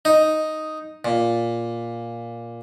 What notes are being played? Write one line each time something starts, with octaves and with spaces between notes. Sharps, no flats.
D#4
A#2